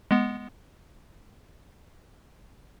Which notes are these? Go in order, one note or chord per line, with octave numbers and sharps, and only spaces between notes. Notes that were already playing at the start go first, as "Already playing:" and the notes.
G#3 B3